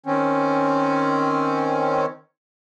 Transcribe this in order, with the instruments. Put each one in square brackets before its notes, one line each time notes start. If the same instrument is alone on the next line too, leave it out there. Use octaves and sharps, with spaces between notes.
[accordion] D#3 C4 C#4